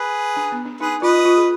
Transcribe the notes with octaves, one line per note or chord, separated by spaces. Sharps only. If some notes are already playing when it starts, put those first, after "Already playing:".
Already playing: G#4 B4
D4
B3
D4
D#4 G#4 B4
F4 B4 D#5
F4
G#4